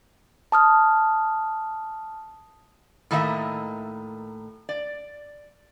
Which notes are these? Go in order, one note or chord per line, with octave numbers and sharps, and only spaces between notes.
A5 D#6 F6
A2 D#3 A#3 D#5 E5
D5